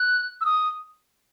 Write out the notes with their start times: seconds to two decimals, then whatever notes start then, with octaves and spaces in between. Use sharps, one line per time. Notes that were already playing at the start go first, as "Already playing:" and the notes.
Already playing: F#6
0.41 E6
0.45 D#6